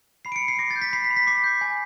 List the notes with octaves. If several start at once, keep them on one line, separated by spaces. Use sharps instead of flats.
B5 C7
D7
C#7
B5
C7
D6 A#6
A6
G6
B6
B5 C7
B6
B5
B6
D6 C7
G6
G#5